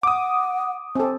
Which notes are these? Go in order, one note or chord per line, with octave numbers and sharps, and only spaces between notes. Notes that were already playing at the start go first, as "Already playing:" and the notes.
F#5 D6 D#6
C4 A4 G#5